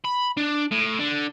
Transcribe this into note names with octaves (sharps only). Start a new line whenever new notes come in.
B5
D4
A2
D3